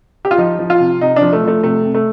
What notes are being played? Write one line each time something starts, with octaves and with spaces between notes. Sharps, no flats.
G4
F4
F3 D#4
F3
F4
C3
C3 D#4
F3 D4
A3
F3 A3
C3 A3
C3
A3